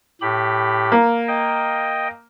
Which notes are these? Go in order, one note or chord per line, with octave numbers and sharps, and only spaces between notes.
A2 G4 B5
A#3
D#5 G5